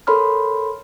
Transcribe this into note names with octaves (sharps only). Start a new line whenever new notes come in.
A4 A#4 C#5 B5 C6 F6